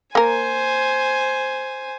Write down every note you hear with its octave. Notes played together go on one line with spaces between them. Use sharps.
A#3 A#4 C5 G#5